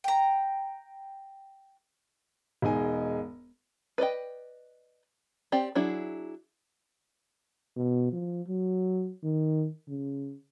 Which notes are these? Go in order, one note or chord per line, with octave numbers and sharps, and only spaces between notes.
G5 A#5
E1 G#3 D#4 G#5
B4 D5 D#5 G5
C4 G4 D5
F#3 D4 E4 G#4
B2
F3
F#3
D#3
C#3